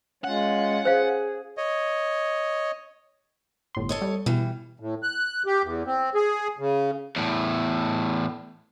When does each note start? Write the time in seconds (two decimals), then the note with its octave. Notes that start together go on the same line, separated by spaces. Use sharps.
0.24 G#3 C#4 F4 F#5
0.85 G#4 C5 F5
1.57 C#5 D#5
3.75 G1 A2 C6
3.89 A4 C#5 D#5
4.02 G3
4.26 B2 E3 G3
4.80 A2
5.03 F#6
5.46 G4
5.63 E2
5.86 C4
6.15 G#4
6.58 C#3
7.16 E2 A2